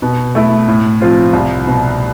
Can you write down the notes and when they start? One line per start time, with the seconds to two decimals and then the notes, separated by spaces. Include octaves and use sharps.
0.02 B2
0.35 A3 E4
0.68 A2
1.01 F3 C4 F4
1.33 C2
1.67 B2 B3